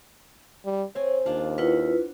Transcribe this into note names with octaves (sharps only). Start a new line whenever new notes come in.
G3
C4 C#5 G#5
D#2 D4 F4
E4 F4 B4 F#5